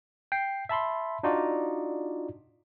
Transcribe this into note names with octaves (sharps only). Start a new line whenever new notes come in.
G5 C7
E5 A5 B5 C6
D4 D#4 F4 F#4 D5